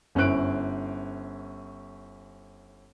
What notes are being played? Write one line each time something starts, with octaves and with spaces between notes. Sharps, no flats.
G1 C#4 E4 C5 F#6 D7